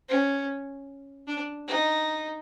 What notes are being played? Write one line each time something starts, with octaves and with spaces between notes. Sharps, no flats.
C#4
D4
D#4